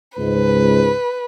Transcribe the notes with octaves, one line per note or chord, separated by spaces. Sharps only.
C#2 G#2 B4